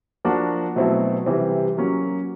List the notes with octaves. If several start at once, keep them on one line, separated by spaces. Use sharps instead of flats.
F3 A#3 D4 F#4
B2 F#3 A3 C4 E4
C3 E3 G3 C4
F#3 A#3 C#4